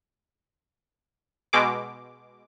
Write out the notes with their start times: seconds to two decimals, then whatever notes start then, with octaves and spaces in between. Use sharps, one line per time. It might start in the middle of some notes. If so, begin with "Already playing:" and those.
1.53 B2 G#3 D6